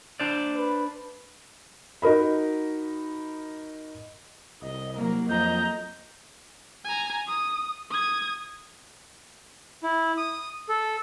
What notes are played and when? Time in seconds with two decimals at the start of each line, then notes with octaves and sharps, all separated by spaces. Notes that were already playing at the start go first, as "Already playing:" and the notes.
0.20 D4 C5 D5
0.57 B4
2.02 D#4 F#4 A#4 D#5 B5
4.62 C2 D#5
4.97 F#3 A#3 A#4
5.29 F2 D#5 A#5 G6
6.84 G#5 A#5
7.27 D#6
7.90 D#6 G#6
9.83 E4
10.18 D#6
10.69 A4